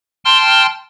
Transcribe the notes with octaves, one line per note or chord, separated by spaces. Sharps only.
G5 A5 C6 F6